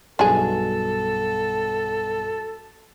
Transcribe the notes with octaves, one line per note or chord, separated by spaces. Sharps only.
B1 G2 B2 D4 G#4 A4